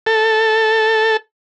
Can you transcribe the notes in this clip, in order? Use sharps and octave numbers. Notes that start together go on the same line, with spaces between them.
A4